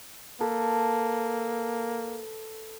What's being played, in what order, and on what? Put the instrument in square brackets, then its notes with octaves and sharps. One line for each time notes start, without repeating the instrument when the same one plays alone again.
[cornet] A#3 [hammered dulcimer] A4 B4